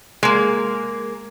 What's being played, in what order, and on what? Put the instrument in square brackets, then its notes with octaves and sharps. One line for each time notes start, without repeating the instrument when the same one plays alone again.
[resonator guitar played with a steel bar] G#3 A#3